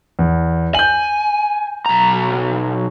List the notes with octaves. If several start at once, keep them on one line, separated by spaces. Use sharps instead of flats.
E2
G#5 G6 F#7
B1 A#5